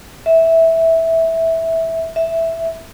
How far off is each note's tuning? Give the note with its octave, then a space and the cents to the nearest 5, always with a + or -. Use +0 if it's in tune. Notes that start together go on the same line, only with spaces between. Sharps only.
E5 -10
E5 +0